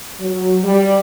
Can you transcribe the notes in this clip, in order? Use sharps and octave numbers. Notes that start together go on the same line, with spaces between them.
F#3
G3